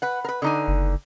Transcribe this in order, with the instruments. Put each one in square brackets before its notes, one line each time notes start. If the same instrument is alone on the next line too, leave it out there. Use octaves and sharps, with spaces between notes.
[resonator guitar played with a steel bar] B4 F#5
A#4 B4
D3 D#4 G#5
[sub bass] F#1